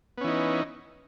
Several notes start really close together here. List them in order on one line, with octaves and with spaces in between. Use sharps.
B3 C#4 E3 D#4